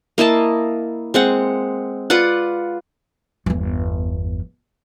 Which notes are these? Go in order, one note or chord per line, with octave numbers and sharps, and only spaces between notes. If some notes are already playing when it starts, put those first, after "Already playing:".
A#3 E4 D#5 A5
G#3 C4 F#5
F4 B4 D5 F#5
G1 E2